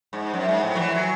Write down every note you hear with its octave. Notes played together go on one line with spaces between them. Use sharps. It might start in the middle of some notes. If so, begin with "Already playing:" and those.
G#2
F#2
G#2
A2
F#3
E3
F#3